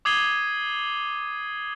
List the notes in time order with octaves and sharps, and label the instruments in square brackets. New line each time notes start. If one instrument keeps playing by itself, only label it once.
[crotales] D6 D#6 G#6 C7 D#7 G7